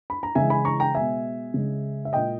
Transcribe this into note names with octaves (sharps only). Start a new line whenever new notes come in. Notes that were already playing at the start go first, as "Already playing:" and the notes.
B5
A#5
C#3 E3 G#3 E5 G#5
G#5 B5
A#5 C#6
G5 A#5
B2 G#3 E5 G#5
C#3 G#3
E5
A#2 G#3 D#5 G5